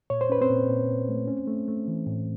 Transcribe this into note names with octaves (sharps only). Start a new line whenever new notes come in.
A#2 C#5
C5
C#4 B4
C4 C5
A#2
A#2
A#2
A3
C#4
A3
A3
E3
A2